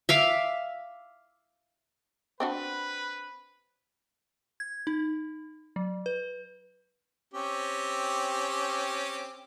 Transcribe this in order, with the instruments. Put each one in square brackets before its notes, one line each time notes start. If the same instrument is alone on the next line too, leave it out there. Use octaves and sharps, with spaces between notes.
[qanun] E5 F5 D6
[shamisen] C4 D4 F#4 [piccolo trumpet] B4
[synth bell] G#6
D#4
F#3
B4
[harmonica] C4 C#4 G4